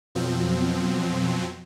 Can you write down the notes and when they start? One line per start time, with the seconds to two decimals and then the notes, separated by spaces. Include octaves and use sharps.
0.15 F2 B2 F3 F#3 C4